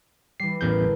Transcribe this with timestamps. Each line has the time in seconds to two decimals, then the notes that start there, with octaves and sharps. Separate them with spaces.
0.40 E3 G3 C7
0.61 A1 E2 G#4 A#4 B4 G6
0.82 D3